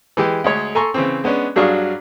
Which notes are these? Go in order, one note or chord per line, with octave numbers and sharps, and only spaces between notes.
E3 G#3 G4
D2 G#3 C#5
A4 G#5 A#5 C6 C#6
C#3 E3 C4
G#3 B3 C#4 D4
G2 F#3 D4 G#4 F5 C#6